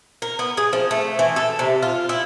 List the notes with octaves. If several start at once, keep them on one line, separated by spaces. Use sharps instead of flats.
A#4
B3
G#4
F3
A3
E3
A4
C3
F4
E4